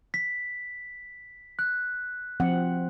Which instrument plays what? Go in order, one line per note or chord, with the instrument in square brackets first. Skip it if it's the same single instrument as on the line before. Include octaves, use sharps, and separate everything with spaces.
[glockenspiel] B6
F#6
[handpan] F3 C4 F#5